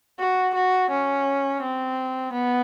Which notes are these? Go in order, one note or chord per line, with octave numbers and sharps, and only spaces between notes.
F#4
F#4
C#4
C4
B3